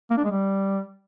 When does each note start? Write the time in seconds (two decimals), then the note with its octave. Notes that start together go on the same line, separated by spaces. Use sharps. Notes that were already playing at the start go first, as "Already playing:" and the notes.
0.11 A#3
0.18 D4
0.24 G#3
0.31 G3